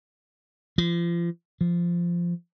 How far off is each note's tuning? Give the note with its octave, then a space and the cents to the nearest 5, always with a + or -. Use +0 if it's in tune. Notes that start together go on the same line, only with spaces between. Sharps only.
F3 -35
F3 -15